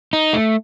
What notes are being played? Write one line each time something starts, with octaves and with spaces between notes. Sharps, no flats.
D#4
A3